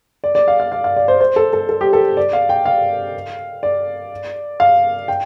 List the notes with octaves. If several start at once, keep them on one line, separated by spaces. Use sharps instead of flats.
D5
D5
F5
F5
F5
F5
D5
C5
C5
A4
A4
A4
G4
A4
D5
F5
G5
F5
D5
F5
G5